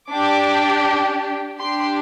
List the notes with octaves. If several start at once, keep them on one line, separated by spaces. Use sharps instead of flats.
D4 G4 D6
D4 G4 C6